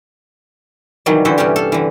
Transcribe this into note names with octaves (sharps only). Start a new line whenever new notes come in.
C3 D#3 E3 F#3 G3
D3 E3 E4 F#4 A4 C5
G2 C3 B3 C#4 G4
A4 F5
D3 E3